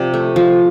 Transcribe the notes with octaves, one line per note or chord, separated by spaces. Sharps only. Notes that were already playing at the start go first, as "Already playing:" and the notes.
Already playing: C3 F3 D5
A3
F3